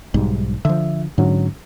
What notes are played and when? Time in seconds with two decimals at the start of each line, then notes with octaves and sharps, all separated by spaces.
0.14 B1 G#2 G3
0.65 D3 F3 E5
1.18 G#2 D3 F#3 C#4